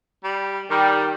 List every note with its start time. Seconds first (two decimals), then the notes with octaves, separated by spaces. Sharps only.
0.24 G3
0.71 D#3 G3 G4